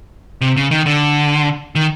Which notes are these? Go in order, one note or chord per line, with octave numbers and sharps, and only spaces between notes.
C3
C#3
D#3
D3
D#3